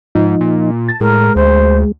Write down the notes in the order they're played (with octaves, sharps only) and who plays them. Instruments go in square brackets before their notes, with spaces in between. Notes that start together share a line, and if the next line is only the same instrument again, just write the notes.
[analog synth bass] G#2 [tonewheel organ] F3 D#4
[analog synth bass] A#2
[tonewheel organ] A5
[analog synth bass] A2 [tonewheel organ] G#3 [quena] A#4
[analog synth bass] D2 [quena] C5